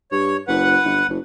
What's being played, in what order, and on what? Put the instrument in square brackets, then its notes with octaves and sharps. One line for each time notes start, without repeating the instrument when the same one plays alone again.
[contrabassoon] G2 [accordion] C#5
[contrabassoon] F#1 [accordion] B4 F#5
[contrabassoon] G1
F#1